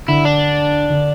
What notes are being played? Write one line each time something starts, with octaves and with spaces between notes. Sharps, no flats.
D3 E4
D4
D3